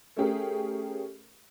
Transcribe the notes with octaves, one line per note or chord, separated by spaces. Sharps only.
A3 C#4 G4 G#4 A#4